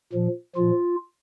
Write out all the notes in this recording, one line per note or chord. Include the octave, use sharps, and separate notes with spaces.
A#2 F3
A#2 F3 F4